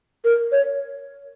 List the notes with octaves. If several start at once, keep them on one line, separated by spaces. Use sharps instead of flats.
A#4
C#5